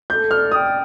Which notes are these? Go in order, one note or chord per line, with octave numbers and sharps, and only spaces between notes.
A4 G6
D5 F6
G5 D#6